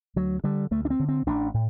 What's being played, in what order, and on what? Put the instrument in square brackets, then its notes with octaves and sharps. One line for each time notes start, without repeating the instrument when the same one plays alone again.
[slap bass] D2 F#3
D3 G3
D2 A3
D4
C4
D3
C4
A1 D4
A2